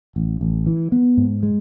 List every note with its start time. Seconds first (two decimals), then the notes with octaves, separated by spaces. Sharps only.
0.16 A1
0.41 A1
0.66 E3
0.92 B3
1.17 G#2
1.43 G#3